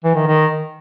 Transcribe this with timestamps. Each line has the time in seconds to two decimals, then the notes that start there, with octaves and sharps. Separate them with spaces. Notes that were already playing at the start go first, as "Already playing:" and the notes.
0.05 E3
0.16 D#3
0.27 D#3